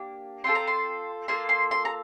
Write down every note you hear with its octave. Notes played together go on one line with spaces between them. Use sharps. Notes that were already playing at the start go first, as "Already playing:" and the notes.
Already playing: A#3 D4 G4
C4 F4 A4 C6
A#5
C6
A#3 F4 A4 C6
C6
C6
A#5